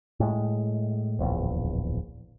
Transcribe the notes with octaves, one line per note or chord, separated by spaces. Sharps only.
A2 G#3
D1 A#1 E2